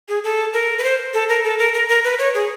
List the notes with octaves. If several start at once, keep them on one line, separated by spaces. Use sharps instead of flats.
G#4
A4
A#4
B4
C5
A4
A#4
A4
A#4
A#4
A#4
B4
C#5
G#4